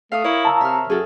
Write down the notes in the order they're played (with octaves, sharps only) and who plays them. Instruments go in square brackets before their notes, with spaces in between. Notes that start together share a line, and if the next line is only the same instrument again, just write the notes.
[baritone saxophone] A3 [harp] F5 D#6
[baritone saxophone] E4 [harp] A#4 C#5
[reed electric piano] A5 A#5 E6
[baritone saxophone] C3 [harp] E5 F6
[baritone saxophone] F#2 [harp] G#4 A4